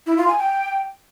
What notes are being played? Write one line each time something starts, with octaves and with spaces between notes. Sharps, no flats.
E4
F4
G#5
G5